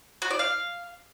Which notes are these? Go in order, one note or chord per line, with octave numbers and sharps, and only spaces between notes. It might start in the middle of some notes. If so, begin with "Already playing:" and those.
F#4
D5
F5